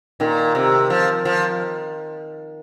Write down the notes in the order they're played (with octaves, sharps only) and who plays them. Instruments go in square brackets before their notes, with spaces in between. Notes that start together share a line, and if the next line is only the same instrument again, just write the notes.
[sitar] A#2 [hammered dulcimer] D#3
[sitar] C3
F3
F3